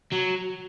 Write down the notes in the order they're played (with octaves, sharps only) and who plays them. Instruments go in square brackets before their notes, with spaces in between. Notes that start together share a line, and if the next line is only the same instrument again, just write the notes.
[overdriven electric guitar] F#3